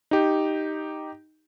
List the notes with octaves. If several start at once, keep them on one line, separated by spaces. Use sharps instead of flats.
D#4 G4